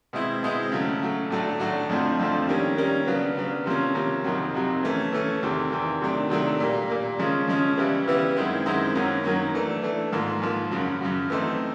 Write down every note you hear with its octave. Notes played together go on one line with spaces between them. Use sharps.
B2 G#3 C4 E4
B2 G#3 C4 E4
C#3 F#3 A3
C#3 F#3 A3
A2 F#3 A3 D4 F#4
A2 F#3 A3 D4 F#4
F2 D3 F3 A3 C4
F2 D3 F3 A3 C4
D#3 G3 A#3 C#4
D#3 G3 A#3 C#4
C#3 F#3 B3 D4
C#3 F#3 B3 D4
C3 F3 A#3 C#4
C3 F3 A#3 C#4
F2 C3 D#3 F#3
F2 C3 D#3 F#3
E3 A3 C#4
E3 A3 C#4
E2 C3 D#3
E2 C3 D#3
C3 D#3 F#3 A3 D4
C3 D#3 F#3 A3 D4
A#2 G3 A#3
A#2 G3 A#3
C#3 F3 G#3 C#4
C#3 F3 G#3 C#4
C#3 E3 G3 B3 E4
C#3 E3 G3 B3 E4
F#2 D#3 G#3 C4 E4
F#2 D#3 G#3 C4 E4
F#2 D#3 F#3 A#3 C#4
F#2 D#3 F#3 A#3 C#4
E3 A3 D4
E3 A3 D4
G#2 F3 A#3
G#2 F3 A#3
F#2 C#3 F#3
F#2 C#3 F#3
E3 A3 C4 D#4